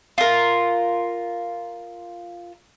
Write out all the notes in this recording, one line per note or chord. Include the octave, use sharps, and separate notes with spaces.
F4 A#4